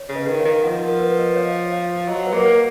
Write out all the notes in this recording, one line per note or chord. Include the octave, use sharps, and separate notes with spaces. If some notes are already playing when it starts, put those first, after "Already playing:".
Already playing: C#5
C#3
B4 D#5
D#3
C#5 F5
D#3
F3 D#5 F#5
A#4
B4
B4 D#5
C#5 F5
C#5 F5
F#3 D#5 F#5
B4
A#3
C#5